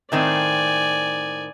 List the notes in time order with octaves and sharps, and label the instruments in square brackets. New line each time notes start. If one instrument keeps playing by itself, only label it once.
[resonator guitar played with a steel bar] A2 D#3 C4 [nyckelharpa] D5 G#5